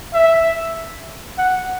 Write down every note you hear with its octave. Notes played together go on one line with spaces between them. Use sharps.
E5
F#5